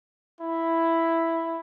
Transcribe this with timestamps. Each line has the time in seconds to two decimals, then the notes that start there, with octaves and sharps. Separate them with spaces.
0.41 E4